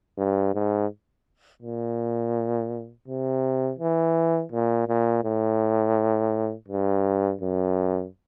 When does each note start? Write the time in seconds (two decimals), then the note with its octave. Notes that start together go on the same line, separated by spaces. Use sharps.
0.18 G2
0.54 G#2
1.62 A#2
3.08 C3
3.79 E3
4.52 A#2
4.88 A#2
5.24 A2
6.69 G2
7.42 F#2